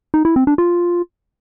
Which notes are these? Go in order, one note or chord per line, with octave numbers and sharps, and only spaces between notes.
D#4
E4
C4
D4
F4